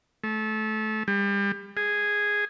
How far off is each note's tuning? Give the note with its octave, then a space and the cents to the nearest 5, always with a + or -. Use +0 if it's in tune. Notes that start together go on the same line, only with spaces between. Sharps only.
A3 -25
G3 +35
G#4 -5